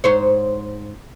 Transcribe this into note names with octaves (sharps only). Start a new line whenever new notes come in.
G#2 C5 C#5